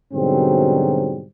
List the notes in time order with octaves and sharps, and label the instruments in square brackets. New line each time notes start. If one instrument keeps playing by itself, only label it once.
[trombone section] G#2 B2 D3 F#3 G3 C4